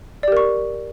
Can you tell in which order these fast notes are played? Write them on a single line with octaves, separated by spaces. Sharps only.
D5 G4 A#4 C#6